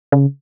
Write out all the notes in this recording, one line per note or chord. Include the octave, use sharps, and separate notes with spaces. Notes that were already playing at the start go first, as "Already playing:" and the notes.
C#3